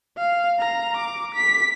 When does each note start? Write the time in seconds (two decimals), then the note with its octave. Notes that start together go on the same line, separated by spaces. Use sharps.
0.18 F5
0.59 A#5
0.97 D6
1.35 B6